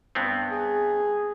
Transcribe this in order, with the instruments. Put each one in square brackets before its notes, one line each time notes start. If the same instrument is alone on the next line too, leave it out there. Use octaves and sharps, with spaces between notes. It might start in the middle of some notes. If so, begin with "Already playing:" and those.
[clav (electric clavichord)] G2 B3 C4
[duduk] G#4